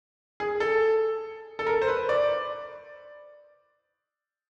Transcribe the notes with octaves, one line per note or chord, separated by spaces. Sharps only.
G#4
A4
A4
A#4
C5
B4
D5